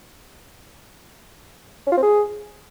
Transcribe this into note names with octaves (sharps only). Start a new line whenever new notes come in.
C#4
F4
C4
G#4